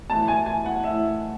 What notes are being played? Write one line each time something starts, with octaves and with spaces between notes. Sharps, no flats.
A2 E3 A5
G#5
G#5
F#5
A2 E3 E5